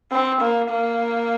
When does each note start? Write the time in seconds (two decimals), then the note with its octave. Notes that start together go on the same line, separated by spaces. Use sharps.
0.12 C4
0.41 A#3
0.70 A#3